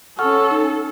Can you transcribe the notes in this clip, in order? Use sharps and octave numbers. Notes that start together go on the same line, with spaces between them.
C#4 A4 F#5 C#6 F6
D#4